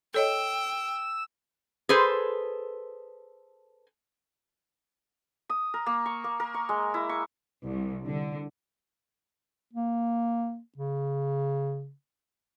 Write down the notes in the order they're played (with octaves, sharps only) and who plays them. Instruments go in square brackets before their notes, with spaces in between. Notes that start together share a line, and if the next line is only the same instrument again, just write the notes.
[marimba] A4 C#5 D#5 [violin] G5 [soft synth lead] E6
[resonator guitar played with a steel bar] G#4 A4 B4 C5
[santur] D#6
A#4
A#3
C#6
A#3
A#4
C#6
G#3
E4
C#6
[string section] C2
D3
[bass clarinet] A#3
C#3